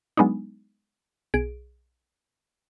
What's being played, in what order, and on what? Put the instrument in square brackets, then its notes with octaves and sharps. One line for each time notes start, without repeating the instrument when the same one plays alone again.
[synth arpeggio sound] F#3 G#3 B3 D4 D#4
B1 G#4 D7